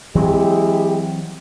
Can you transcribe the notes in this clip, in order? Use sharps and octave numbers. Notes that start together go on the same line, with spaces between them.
E3 F#3 G#3 C4 E4 G4